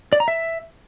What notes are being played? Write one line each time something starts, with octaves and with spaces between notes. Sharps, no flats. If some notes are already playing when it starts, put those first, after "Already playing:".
D5
A#5
E5